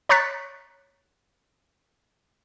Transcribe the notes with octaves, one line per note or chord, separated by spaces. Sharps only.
C#5 A#5 C#6 F#6 A6 B6